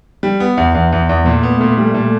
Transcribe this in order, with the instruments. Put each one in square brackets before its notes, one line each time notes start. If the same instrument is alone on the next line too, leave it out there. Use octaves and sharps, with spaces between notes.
[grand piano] G3
B3
E2
[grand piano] E2 [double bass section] E3
[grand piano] E2
E2
[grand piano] A#2 [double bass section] A3
[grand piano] B3
A#2
G3
A#2